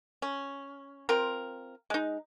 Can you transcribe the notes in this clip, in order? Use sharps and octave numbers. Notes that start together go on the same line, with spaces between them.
C#4
C4 F4 A#4
G#3 D#4